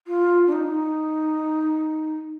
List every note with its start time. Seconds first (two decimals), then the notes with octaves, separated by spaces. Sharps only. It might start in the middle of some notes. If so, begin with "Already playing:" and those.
0.07 F4
0.47 D4
0.52 D#4